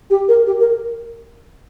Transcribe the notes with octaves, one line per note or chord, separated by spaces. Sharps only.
G4
A#4
G4
A#4